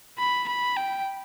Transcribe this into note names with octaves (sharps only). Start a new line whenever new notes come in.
B5
B5
G5